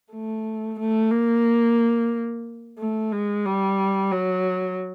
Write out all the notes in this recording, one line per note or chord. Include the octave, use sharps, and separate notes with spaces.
A3
A3
A#3
A3
G#3
G3
F#3